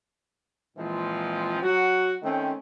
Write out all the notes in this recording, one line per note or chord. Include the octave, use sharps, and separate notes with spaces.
A#2 E3 F3 G#3 C4
F#3 F#4
D#3 A3 C4 C#4